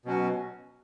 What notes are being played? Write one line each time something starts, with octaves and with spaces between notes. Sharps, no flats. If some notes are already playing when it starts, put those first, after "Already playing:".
B2 F#3 C#4 F#4